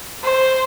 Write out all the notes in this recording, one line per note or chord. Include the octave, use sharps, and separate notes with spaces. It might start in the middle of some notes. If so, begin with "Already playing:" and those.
C5